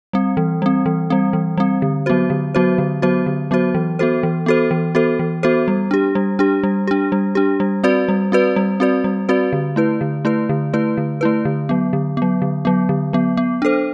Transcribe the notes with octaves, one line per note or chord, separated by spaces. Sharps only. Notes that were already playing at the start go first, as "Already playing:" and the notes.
G3 C4
E3
G3 C4
E3
G3 C4
E3
G3 C4
D3
F#3 B3 F#4 C5
D3
F#3 B3 F#4 C5
D3
F#3 B3 F#4 C5
D3
F#3 B3 F#4 C5
E3
B3 F#4 A4 C5
E3
B3 F#4 A4 C5
E3
B3 F#4 A4 C5
E3
B3 F#4 A4 C5
G3
D4 G4
G3
D4 G4
G3
D4 G4
G3
D4 G4
G3
C4 F#4 B4 D5
G3
C4 F#4 B4 D5
G3
C4 F#4 B4 D5
G3
C4 F#4 B4 D5
D3
A3 E4 B4
D3
A3 E4 B4
D3
A3 E4 B4
D3
A3 E4 B4
D3
F#3 B3
D3
F#3 B3
D3
F#3 B3
D3
F#3 B3
B3
D4 A4 C5